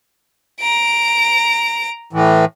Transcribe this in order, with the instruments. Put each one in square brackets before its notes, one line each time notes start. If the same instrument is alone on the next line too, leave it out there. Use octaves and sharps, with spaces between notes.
[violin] A#5 D7
[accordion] A2 E3